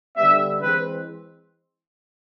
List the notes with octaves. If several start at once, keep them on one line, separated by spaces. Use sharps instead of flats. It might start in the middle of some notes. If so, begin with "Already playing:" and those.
D3 G3 B3 E5
E3 G#3 C4 B4